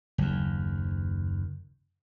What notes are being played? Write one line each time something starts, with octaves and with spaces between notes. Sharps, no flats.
F#1 D#2